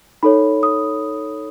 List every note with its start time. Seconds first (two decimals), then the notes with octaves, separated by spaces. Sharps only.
0.23 D#4 A4 C#5 B5
0.63 D#6